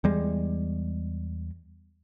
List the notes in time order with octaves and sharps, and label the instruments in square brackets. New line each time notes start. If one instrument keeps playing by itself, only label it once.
[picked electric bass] E2 G3 G#3